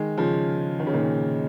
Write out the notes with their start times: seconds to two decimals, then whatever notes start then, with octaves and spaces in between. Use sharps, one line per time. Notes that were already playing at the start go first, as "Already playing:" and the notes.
Already playing: D#3 G#3
0.18 C#3 F3
0.79 D#3
0.87 C#3
0.94 A#2 D#3